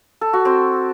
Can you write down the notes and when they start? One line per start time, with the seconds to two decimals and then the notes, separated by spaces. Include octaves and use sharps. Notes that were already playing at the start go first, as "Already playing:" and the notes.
0.21 A4
0.33 F#4
0.45 C4